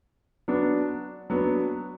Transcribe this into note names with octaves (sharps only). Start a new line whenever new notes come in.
F#3 B3 D4
F#3 B3 D4